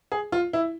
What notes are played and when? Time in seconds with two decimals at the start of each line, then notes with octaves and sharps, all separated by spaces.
0.12 G#4
0.32 F4
0.53 E4